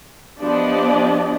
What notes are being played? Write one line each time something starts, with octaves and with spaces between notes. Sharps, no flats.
F3 B3 D4 G4 D5 D#5